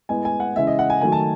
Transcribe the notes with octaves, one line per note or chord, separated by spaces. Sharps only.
A2 G#3 B3 G#5
G#5
F#5
C#3 E3 G#3 E5
D#5
F#5
G#5
D#3 F#3 A3 G#5
A5